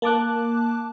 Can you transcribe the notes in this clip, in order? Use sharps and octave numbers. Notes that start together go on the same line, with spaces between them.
A#3 A5 D6 F#6